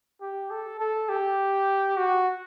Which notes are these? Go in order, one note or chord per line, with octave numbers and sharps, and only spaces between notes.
G4
A4
A4
G4
F#4